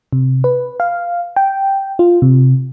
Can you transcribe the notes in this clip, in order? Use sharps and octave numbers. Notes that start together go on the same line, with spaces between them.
C3
B4
F5
G5
F4
C3